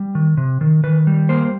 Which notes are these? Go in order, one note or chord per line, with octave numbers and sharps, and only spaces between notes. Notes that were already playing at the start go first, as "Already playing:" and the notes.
Already playing: G3
D#3
C3
D#3
D#3 B4
G3
A#3 C5